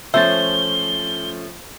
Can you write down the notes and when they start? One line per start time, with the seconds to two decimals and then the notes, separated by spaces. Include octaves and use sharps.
0.14 F3 A3 C#4 C5 E5 A6 G7